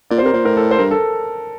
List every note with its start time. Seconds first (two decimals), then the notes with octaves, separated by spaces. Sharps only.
0.11 A#2 D5
0.18 C5
0.22 C3 A#4
0.33 A#2 C5
0.45 A2 A#4
0.57 A4
0.71 C5
0.79 G2 A#4
0.91 A4